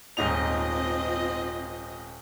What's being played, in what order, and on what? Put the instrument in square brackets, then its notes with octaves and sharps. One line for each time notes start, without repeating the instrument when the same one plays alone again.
[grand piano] D#1 G#2 F7 [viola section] C4 F4 D#5